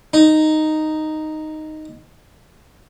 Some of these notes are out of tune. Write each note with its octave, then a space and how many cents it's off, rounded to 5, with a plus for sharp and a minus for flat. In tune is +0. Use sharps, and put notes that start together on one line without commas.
D#4 -5